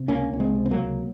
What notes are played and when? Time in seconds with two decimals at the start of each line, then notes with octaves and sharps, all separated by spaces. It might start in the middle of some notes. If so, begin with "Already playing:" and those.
Already playing: C3
0.08 C#2 A#3 C#4
0.32 C#2 C#4
0.40 G#3 C4
0.55 C3
0.66 C4
0.71 F#3 A#3
0.79 C#2